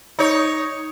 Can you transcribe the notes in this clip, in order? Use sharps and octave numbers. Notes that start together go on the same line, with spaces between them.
D#4 C#5